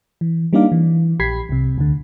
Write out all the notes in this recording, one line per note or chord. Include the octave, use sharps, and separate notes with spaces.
E3
G3 A#3 D4 D#4 D5 F5
E3
A#1 G4 B5 G#6 B6 C7
C2 C3
D2 D3